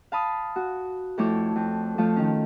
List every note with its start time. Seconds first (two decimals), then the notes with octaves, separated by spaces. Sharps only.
0.12 F5 A5 B5 D#6
0.56 F#4
1.18 F2 A3 E4 A4 C#5 D6
1.56 F2
1.98 F3 A3 F4 C#5
2.16 D#3 C#4